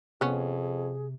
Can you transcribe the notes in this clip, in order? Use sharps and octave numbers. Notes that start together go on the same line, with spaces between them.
F2 C3 B3 C#4 G#4